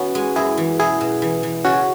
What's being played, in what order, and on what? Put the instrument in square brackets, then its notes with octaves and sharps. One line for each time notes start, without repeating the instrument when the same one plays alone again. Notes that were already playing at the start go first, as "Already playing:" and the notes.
Already playing: [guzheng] E3 B3 [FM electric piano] C#4 F#4
[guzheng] G#3
[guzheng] F#2 [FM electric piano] E4 G#4
[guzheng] E3
[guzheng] B2 [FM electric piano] E4 G#4
[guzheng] B2
E3
E3
[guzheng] C#3 [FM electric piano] C#4 F#4